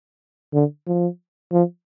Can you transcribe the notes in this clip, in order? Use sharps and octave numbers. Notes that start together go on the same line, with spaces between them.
D3
F3
F3